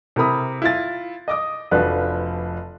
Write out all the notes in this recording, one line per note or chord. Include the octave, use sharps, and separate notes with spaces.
C3 E4 A#4 B5 D#6
E4 F4 A6
D#5 D6 D#6
F1 F3 D4 F#4 B4